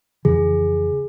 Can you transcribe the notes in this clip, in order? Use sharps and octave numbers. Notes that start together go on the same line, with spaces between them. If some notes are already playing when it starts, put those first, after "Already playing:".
F2 C#3 E3 G#4